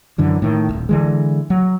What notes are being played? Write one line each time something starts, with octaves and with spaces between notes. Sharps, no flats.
F#2 D3 E3
A2 D#3
D#1 B1
D3 E3 G#3
F#3